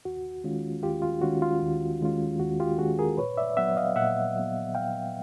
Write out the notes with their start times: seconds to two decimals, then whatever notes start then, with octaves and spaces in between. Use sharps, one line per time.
0.05 D#2 F#4
0.44 D#3 G#3 C#4 F4
0.83 D#2 F4 G4
1.02 F4
1.22 D#3 G#3 C#4 F4 F#4
1.42 F4
1.62 D#2
2.01 D#3 G#3 C#4 F4
2.40 D#2 F#4
2.60 F4 G4
2.78 D#3 G#3 C#4 F4 F#4 G#4
2.99 G#4 A#4
3.18 A#2 B4 C#5
3.37 D5 E5
3.57 F#3 B3 E5 F#5
3.77 D#5 F5
3.96 A#2 E5 F#5
4.35 F#3 B3
4.75 A#2 F5 G5